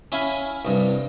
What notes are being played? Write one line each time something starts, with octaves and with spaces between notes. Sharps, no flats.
C#4 E4 F5 G#5 B5
C2 G2